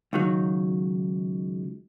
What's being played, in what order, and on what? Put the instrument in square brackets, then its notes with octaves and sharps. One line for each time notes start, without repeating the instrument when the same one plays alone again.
[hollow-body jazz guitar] C#2 D#3 F#3